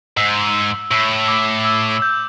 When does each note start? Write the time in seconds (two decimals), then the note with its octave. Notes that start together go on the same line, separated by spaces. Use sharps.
0.17 G#2 E6
0.91 A2 E6
1.28 D6
1.65 E6
2.02 G6